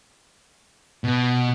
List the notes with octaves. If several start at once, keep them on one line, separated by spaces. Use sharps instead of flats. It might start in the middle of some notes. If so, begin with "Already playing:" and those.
B2